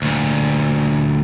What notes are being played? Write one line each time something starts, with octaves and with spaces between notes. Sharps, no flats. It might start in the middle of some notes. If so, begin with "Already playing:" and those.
D2 A#2